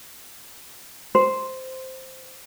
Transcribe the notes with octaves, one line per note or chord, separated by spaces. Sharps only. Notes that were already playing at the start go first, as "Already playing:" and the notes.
C5